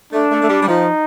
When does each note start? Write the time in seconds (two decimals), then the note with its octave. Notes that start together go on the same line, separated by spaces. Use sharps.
0.12 A3 D4
0.31 A3
0.42 A3
0.49 G3
0.62 G3
0.67 F3 D#4